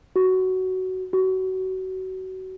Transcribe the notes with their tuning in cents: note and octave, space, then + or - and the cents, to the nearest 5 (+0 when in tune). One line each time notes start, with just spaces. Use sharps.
F#4 +10
F#4 +25